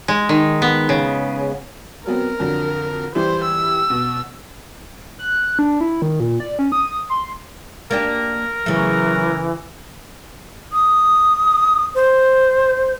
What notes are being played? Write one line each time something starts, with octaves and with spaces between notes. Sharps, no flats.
G#3
D#3
B3
C#3
F#3 B3 C4 A#4
F2 D3 F#3
E3 G3 E4 C5
E6
B2
F#6
D4
E4
D#3
A#2
D5
C#4
D#6
C6
A#3 D4 G4 A#4
C#3 E3 F#3 A3
D#6
C5